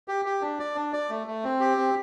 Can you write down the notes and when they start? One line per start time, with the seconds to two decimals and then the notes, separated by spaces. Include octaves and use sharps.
0.08 G4
0.25 G4
0.41 D4
0.59 D5
0.75 D4
0.93 D5
1.09 A3
1.27 A3
1.44 C4
1.60 G4
1.77 C4